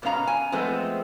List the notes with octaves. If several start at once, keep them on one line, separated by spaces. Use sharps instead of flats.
G#2 B2 B3 C#4 F5 A#5
G#5
F3 G#3 A3 B3 C4